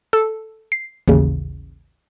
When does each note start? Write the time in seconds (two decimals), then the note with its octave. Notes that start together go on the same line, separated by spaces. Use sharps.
0.13 A4
0.72 C7
1.08 A1 D#2 C#3